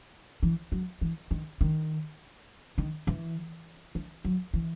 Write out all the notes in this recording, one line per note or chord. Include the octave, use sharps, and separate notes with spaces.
E3
F#3
E3
D#3
D#3
D#3
E3
E3
F#3
E3